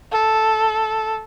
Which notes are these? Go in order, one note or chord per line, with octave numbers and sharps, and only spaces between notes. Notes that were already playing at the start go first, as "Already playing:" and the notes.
A4